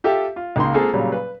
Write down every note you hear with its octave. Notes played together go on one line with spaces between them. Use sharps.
F4 G4 A4 E5 G5
F4
C#2 A#3 D#4 C6
G#3 A#3 C4 F4 G#4 A4
A#2 C#3 F#3 G3
B4